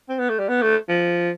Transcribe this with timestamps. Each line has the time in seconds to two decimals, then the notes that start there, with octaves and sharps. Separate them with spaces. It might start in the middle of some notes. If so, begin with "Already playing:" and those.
0.09 C4
0.19 B3
0.29 A3
0.39 G3
0.49 B3
0.62 A3
0.89 F3